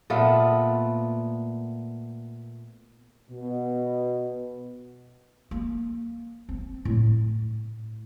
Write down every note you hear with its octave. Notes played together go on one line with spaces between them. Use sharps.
A#2 A3 B3 F4
B2
A#3
C4
A2